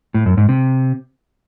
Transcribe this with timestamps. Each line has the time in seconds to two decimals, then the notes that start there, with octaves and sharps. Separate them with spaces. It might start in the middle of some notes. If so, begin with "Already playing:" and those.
0.14 A2
0.26 F#2
0.37 G#2
0.49 C3